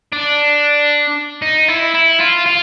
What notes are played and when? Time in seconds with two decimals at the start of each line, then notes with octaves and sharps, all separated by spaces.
0.13 D4
1.42 D#4
1.68 E4
1.94 E4
2.20 F4
2.46 F4